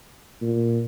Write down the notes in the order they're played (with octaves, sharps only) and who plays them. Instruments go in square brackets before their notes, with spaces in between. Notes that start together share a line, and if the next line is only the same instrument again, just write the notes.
[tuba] A#2